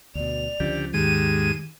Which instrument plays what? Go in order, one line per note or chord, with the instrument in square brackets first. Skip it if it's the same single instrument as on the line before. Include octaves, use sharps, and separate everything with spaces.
[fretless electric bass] D2 B2 [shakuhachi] D5 [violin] F7
[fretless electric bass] C#2 F3 C#4 [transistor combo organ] D3 G4
[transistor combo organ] D#2 G#2 G#3 [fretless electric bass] D#3 [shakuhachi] G4 [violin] D#7 E7